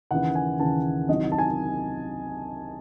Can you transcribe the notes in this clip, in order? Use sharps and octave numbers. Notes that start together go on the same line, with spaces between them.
D#2 C#3 E3 F#5
G#5
D#2 C#3 E3 A5
C2 C3 D#3 F#3 D#5
A5
G#5